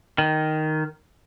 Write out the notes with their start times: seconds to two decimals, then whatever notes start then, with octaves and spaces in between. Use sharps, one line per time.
0.18 D#3